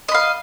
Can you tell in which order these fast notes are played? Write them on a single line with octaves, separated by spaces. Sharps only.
D#5 B5 F5